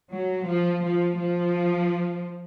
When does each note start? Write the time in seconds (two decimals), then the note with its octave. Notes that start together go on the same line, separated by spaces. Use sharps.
0.12 F#3
0.47 F3
0.84 F3
1.20 F3